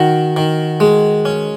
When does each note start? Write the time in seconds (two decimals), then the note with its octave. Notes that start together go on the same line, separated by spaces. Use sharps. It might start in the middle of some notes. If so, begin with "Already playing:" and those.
Already playing: D#3 F#4
0.37 D#3
0.80 G#3
1.25 C#4